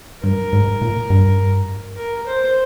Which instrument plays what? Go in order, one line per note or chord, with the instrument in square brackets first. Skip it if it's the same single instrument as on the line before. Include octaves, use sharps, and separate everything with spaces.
[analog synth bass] G2 [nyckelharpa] A#4
[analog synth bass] G#2
A#2
G2
[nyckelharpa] A#4
C5